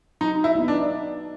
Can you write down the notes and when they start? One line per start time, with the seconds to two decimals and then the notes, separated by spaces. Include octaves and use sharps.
0.21 F#3 D#4
0.44 E4
0.55 B3 D#4
0.68 D4